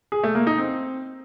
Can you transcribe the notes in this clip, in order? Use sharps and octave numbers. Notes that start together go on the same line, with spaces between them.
G#4
A3
A#3
D#4
C4